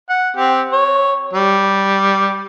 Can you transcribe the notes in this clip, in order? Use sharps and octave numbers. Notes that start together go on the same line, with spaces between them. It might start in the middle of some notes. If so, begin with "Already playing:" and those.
F#5
C4 G4
C#5
G3